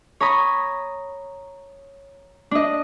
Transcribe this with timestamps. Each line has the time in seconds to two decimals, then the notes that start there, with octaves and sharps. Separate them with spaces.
0.21 C#5 A#5 B5 D#6
2.51 D4 D#5